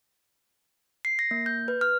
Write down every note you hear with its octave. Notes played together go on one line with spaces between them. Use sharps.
C7
A#6
A#3
G6
B4
F6